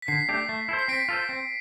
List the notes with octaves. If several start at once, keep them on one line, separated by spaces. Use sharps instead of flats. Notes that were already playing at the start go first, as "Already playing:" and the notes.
B6
D3 C7
A3 D4 G4
A3
E4 A4 C5
C7
C4 B6 D7
F4 A4 C5
C4